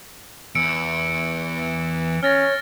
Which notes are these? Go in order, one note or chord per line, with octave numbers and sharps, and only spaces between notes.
E2 E3 E6 C#7 D7
C#4 C#5 F6 A6 A#6